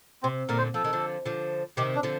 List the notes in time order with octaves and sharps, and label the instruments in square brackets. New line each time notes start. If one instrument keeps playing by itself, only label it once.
[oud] C3 [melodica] C4
[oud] A#2 D3 [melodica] A#4
[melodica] C5
[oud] F3 [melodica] A4
[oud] D#3
D3 F3
D3 F3
[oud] C3 D#3 [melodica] G4
[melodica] D4
[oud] D3 F3